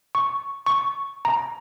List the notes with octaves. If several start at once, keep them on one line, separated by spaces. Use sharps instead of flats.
C#6
C#6
A#5